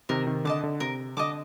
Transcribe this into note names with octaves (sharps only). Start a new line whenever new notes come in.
C3 D#3 A#4
C3 D#3
D3 D#5 A5 D6
D3
C3 A#4
D3 D#5 A5 D6